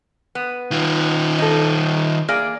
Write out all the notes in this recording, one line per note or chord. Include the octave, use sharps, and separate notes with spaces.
B3
D#3 F4
D#4 A4
A#3 G#4 D5